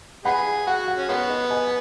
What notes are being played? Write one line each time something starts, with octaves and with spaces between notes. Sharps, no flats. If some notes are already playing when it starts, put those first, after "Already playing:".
B3 D#4 G#4 F#5 B5
F#4 F#5
F#5
C#4
D#3 G#3 B3 F#5
D#5
D#5 G#5